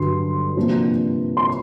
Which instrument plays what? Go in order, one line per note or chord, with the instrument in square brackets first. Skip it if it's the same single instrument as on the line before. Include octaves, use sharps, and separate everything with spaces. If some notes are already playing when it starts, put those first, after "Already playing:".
Already playing: [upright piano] G2 D3 F#3 C6
C3 F3 A#3 D4
C6